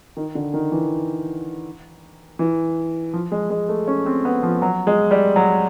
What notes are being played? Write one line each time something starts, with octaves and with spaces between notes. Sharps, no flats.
D#3
D3
D#3
E3
E3
F3
G#3
G#3
A3
C#4
C4
B3
F3
F#3
G#3
G3
F#3